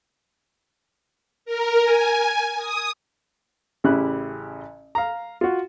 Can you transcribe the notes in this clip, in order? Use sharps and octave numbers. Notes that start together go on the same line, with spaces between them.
A#4
G#5
D#6
A1 C#3 E4 G4 F#6
F5 A#5
F4 F#4